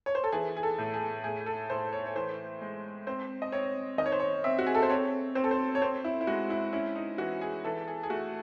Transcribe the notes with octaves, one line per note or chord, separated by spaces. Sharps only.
C#5
C5
A4
E3 G#4
G#4
A4
A2
G#4
A2 G#4
A4
A2 C5
C#5
C#5
E3 C5
G#3
C4 C5
D#5
C4 C#5
D#3 D#5
C#5
C5
C#5
C4 E5
F#4
G#4
A4
C5
C4 C#5
C4 C5
A4
C5
C#5
C4 C5
E4
E4
G#3 F#4
E4
C#4 E4
D#4
E3 F#4
G#4
E3 A4
G#4
G#4
A3 F#4